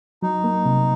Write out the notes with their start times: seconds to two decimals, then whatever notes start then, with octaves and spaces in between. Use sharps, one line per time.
0.23 F#3 D#4
0.44 A#3
0.66 C3